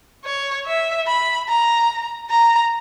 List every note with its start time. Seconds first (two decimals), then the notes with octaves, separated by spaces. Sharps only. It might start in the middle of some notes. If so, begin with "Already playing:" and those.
0.25 C#5
0.66 E5
1.07 B5
1.48 A#5
2.30 A#5